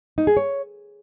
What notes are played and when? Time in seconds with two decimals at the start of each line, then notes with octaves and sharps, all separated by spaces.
0.18 D#4
0.27 G#4
0.37 C#5